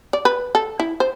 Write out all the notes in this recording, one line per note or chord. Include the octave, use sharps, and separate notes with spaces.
D5
B4
A4
E4
C5